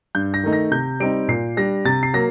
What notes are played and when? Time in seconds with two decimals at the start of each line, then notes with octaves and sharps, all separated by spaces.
0.15 G2 G6
0.34 A#6
0.43 D#3 A3 D#4
0.53 A#6
0.71 C3 G6
1.00 G3 C4 D#4 D7
1.28 A#2 C7
1.57 G3 D4 A#6
1.85 C3 A6
2.03 C7
2.14 F#3 A#3 A#6